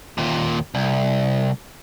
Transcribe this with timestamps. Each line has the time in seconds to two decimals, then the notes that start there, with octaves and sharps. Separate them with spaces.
0.18 D#2 A#2
0.75 C2